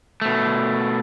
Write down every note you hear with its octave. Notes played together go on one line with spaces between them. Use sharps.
B2 A3